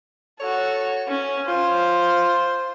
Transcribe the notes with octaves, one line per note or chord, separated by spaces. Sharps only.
F#4 A4 C#5
C#4
F4 C5